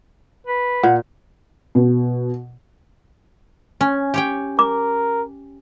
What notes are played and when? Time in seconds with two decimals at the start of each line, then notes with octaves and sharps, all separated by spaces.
0.47 B4
0.83 A#2 F#5
1.75 B2
3.81 C#4
4.14 G4 C#5 G5
4.59 A#4 D6